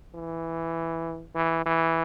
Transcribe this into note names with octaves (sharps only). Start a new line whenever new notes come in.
E3
E3
E3